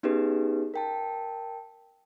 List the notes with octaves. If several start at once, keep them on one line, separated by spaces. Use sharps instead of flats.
B3 C#4 D#4 G4 G#4 B4
A#4 G5 A5